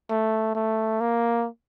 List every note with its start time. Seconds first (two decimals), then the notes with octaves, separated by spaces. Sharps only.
0.10 A3
0.55 A3
1.00 A#3